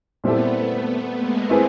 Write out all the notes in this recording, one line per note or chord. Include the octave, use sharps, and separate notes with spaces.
A#2 G3 A3 B3 C4 E4 A4
A3 B3
G#3 A#3
A3 C4 E4 G#4 B4